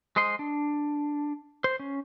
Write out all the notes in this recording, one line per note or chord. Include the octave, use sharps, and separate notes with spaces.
G#3 C5 D#5 C6
D4
C5
C#4